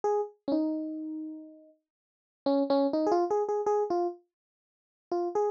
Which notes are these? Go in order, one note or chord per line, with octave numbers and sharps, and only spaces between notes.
G#4
C#4
D#4
C#4
C#4
D#4
G#4
F4
G#4
G#4
G#4
F4
F4
G#4